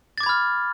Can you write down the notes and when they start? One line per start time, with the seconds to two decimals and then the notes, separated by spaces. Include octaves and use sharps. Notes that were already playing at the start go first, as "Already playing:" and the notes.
0.18 A6
0.20 D6
0.23 G#6
0.26 B5
0.29 F6